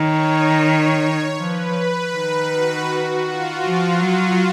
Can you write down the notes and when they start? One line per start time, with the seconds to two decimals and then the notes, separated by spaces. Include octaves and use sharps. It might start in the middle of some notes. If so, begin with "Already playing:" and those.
Already playing: D#3 C#5
1.37 F3 B4
2.12 D#3
2.50 F#4
2.88 F#4
3.26 F4
3.64 F3 F#4
4.01 F#3